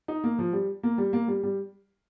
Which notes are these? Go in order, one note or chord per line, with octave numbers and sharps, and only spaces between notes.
D#4
A#3
F3
G3
A#3
G3
A#3
G3
G3